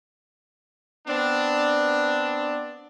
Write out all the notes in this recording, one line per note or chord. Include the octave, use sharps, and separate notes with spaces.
B3 C4 D4